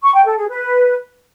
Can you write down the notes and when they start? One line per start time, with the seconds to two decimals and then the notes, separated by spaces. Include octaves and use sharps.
0.03 C#6
0.14 G5
0.26 A4
0.37 G#4
0.49 B4